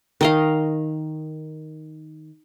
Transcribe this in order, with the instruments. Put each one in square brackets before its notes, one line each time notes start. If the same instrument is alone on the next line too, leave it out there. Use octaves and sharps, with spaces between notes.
[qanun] D#3 D#5 F5